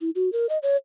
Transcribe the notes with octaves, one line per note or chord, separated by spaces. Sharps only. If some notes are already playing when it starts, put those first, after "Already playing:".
E4
F#4
A#4
D#5
C#5